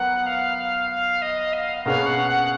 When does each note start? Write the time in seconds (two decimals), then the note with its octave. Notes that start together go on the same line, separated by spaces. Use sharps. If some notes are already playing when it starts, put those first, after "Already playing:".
Already playing: F#3 B3 F#4 A#4 F#5
0.26 F5
0.58 F5
0.90 F5
1.22 D#5
1.53 F5
1.85 B2 A#3 C#4 G#4 B4 F5
2.06 F#5
2.28 F#5